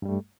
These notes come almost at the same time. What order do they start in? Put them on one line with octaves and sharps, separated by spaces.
G2 G3 A3